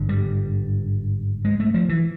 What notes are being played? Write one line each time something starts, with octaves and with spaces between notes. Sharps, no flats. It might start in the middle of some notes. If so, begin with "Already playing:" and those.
Already playing: G#1 G2 D3
G3
G#3
A3
F3
E3